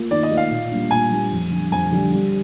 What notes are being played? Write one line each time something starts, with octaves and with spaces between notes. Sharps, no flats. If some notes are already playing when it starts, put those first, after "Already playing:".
Already playing: A#3 F4
D#3 D5
D#5
A#3 F4
F5
A#2
G3 A#3 D4
A#2 G#5
G3 A#3 D4
F2
D3 G3
F2 G#5
D3 G3
G3